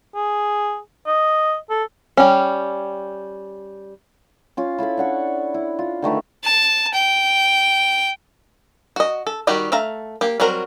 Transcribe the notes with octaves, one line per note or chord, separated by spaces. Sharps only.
G#4
D#5
A4
G3 C#4
C#4 F4
E4 F4 A4 B5
D4 F#5 C#6
E4
F4
D3 D#3 A3 B4
A5
G5
F#4 D#5
A4
D#3 G3 D#4 F#4 G4
A3 E5 F5 A#5
A#3 G4
F#3 G3 C4 F#4 A#4